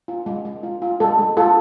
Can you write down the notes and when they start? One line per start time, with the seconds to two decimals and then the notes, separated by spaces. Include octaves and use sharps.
0.08 F4
0.26 G#3
0.45 G#3
0.63 F4
0.82 F4
1.00 G#3 A4
1.19 G#3
1.37 F4 A4